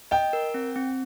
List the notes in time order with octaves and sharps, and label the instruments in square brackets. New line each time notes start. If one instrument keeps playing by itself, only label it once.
[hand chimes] D#5 [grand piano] G5
[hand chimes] A#4
C4
C4